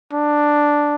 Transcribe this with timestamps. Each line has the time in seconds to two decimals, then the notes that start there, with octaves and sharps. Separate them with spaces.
0.13 D4